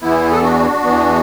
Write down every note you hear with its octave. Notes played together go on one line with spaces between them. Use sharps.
E2 E3 B3 E4
A4
D4 F#4
E2 E3 B3